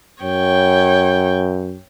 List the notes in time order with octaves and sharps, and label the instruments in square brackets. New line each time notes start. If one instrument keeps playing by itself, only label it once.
[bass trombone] F#2 [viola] C#5 G5